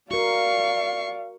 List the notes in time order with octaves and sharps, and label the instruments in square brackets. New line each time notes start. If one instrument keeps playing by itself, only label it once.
[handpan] F#4 A#4 [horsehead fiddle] D5 F5 [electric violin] C#6 C7